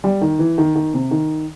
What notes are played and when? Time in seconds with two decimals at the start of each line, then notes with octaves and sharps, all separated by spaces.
0.04 G3
0.21 D#3
0.39 E3
0.58 D#3
0.76 D#3
0.94 C3
1.11 D#3